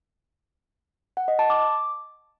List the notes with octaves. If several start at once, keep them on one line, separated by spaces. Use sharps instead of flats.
F#5
D#5
A5
D6